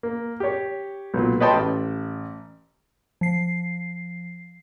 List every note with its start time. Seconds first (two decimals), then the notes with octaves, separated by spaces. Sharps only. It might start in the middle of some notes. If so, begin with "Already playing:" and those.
0.03 A#3
0.40 G4 C#5
1.14 B1 A#2
1.40 B4 C#5 D#5 G5 A5 C6
1.53 A1
3.21 F3 C7